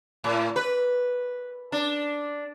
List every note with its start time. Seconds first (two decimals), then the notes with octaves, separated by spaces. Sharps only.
0.24 A2
0.56 B4
1.72 D4